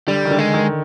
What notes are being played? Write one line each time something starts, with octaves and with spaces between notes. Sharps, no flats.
D3 G3
D#3
D3
G#3
D#3